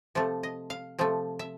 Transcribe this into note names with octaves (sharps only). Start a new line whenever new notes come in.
C3 F3 A3
D#5
F5
C3 F3 A3
E5